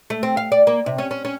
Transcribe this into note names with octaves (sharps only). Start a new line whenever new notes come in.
A3
C4
F5
D5
A#3
C3
C#4
C#4
C#4